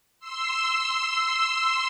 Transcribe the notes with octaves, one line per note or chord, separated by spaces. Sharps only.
C6 E6